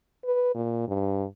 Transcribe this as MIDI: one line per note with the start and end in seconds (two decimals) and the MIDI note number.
0.25 0.50 71
0.55 0.87 46
0.88 1.24 43